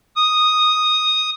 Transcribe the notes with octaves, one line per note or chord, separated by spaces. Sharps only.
D#6